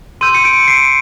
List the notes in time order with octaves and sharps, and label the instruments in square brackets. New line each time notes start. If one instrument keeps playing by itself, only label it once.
[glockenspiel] C6 E6 G6 D#7
C#7
D7
C7